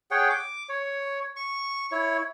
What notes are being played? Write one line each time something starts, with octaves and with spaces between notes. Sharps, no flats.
G#4 C#5 F#5 G5
D6
C#5
C#6
E4 C#5